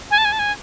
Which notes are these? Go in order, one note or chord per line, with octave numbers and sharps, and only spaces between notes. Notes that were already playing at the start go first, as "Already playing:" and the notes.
G#5
A5
G#5
A5
G#5